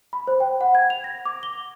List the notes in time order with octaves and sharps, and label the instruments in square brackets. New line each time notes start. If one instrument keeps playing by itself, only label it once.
[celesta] B5
C5
G5
F#5
G#6
F7
A#6
D6
G7